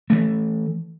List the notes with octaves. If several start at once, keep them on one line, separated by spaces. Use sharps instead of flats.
E3 A3